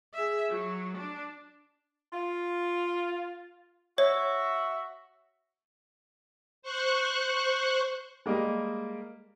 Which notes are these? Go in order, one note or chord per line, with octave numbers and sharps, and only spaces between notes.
G#4 E5
F#3
D4
F4
F#4 C#5 E5
C5 C#6 F#6
G3 G#3 A#3 A#4 D#5